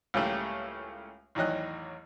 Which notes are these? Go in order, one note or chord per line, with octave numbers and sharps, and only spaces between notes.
C#2 A2 C#3 G3 A3 A#3
A1 E2 D#3 F#3 D#5 F#6